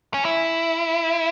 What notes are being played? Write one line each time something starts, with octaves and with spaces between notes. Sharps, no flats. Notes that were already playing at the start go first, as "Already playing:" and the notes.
C#4
E4